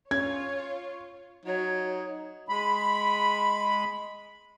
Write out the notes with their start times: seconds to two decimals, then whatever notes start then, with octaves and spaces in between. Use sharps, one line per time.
0.11 C#4 F4 C#5 G#6
1.46 F#3 D#4 C#5
2.49 G#3 B5